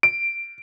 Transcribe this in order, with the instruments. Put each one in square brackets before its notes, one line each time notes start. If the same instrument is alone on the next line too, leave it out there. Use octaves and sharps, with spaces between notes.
[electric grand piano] D7